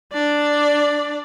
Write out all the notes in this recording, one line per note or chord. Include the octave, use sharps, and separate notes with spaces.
D4 D5